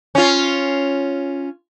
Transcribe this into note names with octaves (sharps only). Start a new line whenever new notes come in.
C#4 F4